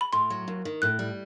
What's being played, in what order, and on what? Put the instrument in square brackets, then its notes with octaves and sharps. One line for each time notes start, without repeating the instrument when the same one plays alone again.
[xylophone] B5
[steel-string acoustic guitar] A2 [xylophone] C6
[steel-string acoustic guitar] F#3
D#2
D#3
[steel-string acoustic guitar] A2 [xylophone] F#6
[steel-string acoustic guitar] G3